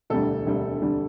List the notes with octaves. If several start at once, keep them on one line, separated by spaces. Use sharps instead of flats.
E1 D2 D3 G3 A3 A4
E1 D2 D3 G3
E1 D2 D3 G3